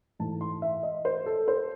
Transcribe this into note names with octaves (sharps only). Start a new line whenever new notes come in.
G#2 E3 A3 A5
C6
E5
D#5
C5
A4
C5